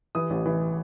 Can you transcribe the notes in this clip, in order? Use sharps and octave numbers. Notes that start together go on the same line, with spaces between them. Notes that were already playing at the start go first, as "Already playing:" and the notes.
E3 D#6
A1
E3